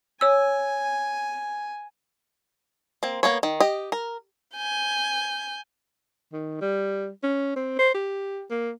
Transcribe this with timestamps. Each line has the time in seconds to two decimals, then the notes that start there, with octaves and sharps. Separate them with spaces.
0.21 C#5 G#5 E6
3.03 A#3 C4
3.23 A#3 B3 C#5
3.43 D#3
3.60 G4 D#5
3.92 A#4
4.55 G#5 G6
6.33 D#3
6.61 G3
7.23 C#4
7.56 C4
7.79 C5
7.95 G4
8.50 A#3